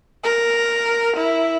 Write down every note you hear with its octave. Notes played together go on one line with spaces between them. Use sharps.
A#4
E4